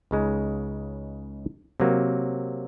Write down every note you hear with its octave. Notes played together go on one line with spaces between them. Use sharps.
C#2 C#3 G#3 D#4
C3 F#3 A#3